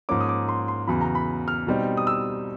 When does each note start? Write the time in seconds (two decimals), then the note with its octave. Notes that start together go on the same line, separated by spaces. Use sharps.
0.09 G#2 F3 A#3 C#4 D6
0.21 D#6
0.29 D6
0.49 C6
0.68 C6
0.87 E2 C#3 F#3 B5
1.01 A#5
1.15 B5
1.48 F6
1.67 B2 G3 C4 D#4
1.97 D#6
2.07 E6